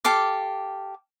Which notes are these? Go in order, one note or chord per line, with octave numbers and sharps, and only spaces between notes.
G4 A4 F5 D6